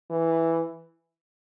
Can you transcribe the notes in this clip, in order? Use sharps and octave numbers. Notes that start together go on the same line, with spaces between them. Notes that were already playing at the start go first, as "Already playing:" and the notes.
E3